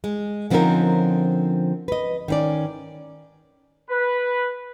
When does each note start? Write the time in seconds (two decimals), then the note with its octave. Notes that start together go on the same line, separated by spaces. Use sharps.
0.04 G#3
0.50 D3 F3 C4 C#4 D#4 A#4
1.88 B4 D#5
2.28 D#3 C#4 D5
3.90 B4